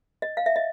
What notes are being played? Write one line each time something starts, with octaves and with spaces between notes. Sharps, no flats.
D#5
F5
E5
D#5